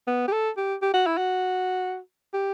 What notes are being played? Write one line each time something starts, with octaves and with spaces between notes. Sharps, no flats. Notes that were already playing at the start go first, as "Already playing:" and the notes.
B3
G4
A4
G4
G4
F#4
E4
F#4
G4